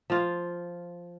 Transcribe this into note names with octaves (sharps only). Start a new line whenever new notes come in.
F3 F4